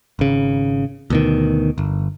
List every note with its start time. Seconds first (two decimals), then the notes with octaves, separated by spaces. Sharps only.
0.19 G#1 C#3
1.10 D2 B2 D#3
1.78 G1